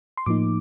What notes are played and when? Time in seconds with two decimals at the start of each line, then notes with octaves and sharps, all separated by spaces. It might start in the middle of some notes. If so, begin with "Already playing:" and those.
0.17 C6
0.26 A2 F3 A#3 D#4 D6